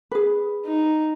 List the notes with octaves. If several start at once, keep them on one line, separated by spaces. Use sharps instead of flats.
G#4 B4
D#4